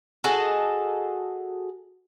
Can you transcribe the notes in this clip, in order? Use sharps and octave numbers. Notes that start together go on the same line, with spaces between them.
F#4 G#4 A4 D#5